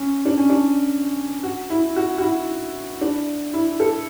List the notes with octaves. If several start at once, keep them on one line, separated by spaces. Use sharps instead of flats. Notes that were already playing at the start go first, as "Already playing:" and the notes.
Already playing: C#4
D4
C#4
D4
F#4
E4
F#4
F#4
E4
D4
E4
A4